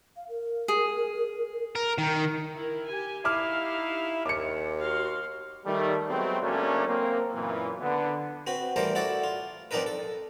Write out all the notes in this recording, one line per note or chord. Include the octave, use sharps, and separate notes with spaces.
F5
A#4
G#4
A#4
D#3
E4 A#4
G4 G#5
D#4 E4 G4 F5 D6 F6
D#2 D6 C#7
F#4 F5 C6
D#3 G3 A3
F#3 G#3 A3 B3 C4
C#3 F#3 A3 A#3 C#4 D4
A#3 C4
F#2 A#2 E3
D3 B3
C4 F#4 B4
E3 G3 A3 A#4 C5
E4 F#4 A4 C#5 D5
F4
F3 C4 D4 D#4 A#4 B4
A4